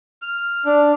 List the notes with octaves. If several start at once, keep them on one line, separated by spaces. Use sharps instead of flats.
F6
D4